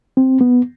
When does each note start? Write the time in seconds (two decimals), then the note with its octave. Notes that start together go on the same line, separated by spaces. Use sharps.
0.17 C4
0.41 B3